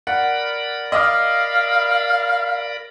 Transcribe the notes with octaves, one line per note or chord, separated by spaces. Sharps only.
A#4 D5 F#5 B5
D#5 F5 D6 F6